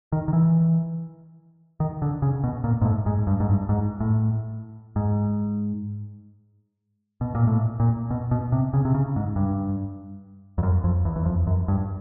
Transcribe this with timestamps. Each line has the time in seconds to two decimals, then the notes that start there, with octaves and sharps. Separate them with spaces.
0.12 D#3
0.28 D#3
0.33 E3
1.80 D#3
2.02 D3
2.22 C#3
2.44 B2
2.64 A#2
2.81 G#2
2.85 A2
3.06 G#2
3.27 G2
3.40 G#2
3.49 G2
3.69 G#2
4.00 A2
4.96 G#2
7.21 B2
7.35 A#2
7.47 A2
7.80 A#2
8.11 B2
8.31 B2
8.52 C3
8.73 C#3
8.85 C3
8.94 C#3
9.16 G#2
9.36 G2
10.58 F2
10.63 F#2
10.84 F2
11.05 E2
11.16 E2
11.26 F2
11.47 F#2
11.68 G2